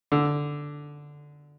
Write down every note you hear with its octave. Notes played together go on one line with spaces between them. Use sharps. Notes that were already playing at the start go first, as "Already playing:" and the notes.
D3